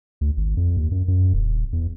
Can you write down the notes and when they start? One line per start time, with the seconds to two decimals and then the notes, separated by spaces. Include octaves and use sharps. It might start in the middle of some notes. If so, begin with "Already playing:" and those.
0.21 D2
0.37 G#1
0.57 F2
0.77 D#2
0.92 F#2
1.08 F#2
1.33 D#1
1.73 E2